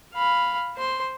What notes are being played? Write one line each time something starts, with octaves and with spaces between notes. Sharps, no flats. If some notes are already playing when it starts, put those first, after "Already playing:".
F5 B5
C5 C6